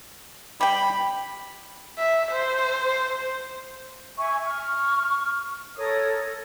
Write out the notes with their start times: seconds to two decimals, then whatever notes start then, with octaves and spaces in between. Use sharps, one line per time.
0.61 G3 G5 B5
1.98 E5
2.31 C5
4.17 E5 G#5 C#6
4.45 C#6 F6
5.77 A4 A#4 C#5 D#6